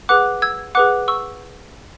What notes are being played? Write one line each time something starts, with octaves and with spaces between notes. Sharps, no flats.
G#4 B4 F#5 D6 F#6
E6 G#6
G#4 B4 F#5 D6 F#6
C#6 E6